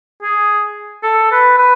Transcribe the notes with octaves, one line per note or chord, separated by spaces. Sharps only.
G#4
A4
B4
B4